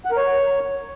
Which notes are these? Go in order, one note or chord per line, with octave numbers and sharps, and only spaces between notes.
F#5
A#4
C#5